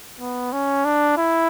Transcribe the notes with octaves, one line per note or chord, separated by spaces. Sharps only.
B3
C#4
D4
E4